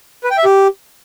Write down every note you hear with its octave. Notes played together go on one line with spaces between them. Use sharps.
B4
G5
E5
G4